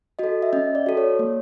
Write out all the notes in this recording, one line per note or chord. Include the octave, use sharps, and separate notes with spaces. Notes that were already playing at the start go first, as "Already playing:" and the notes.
F#4 A4 D#5
E5
C#4 D#5
D5
F#4 A4
C#5
A#3